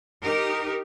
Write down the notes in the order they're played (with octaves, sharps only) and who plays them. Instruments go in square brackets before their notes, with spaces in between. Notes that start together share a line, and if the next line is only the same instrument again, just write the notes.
[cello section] D#4 G4 A#4